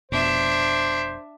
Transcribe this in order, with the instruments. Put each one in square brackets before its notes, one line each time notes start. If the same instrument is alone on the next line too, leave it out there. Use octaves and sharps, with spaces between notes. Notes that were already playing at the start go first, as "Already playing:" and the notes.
[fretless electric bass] F1 F2 B2 [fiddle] D4 E5 [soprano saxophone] C5